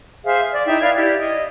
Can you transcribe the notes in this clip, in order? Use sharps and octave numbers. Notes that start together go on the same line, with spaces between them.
G#4 C5 E5 F5
D5
D#4 E4 E5 G5
B4 D5 F5 G#6
E4 G4 D5
D#5